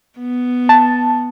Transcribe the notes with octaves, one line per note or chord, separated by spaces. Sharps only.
B3
A5